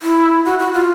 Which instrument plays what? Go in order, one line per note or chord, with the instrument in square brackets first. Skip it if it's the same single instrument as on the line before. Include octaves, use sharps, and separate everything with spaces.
[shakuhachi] E4
F#4
F#4
F4